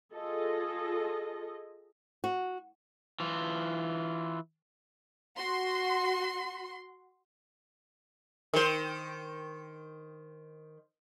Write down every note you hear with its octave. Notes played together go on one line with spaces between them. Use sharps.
F4 G#4 A4 D#5
F#4
E3 F4
F#4 C6
D#3 A#4 C5